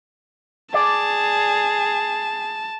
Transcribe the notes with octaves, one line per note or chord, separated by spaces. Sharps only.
G#4 D5 A5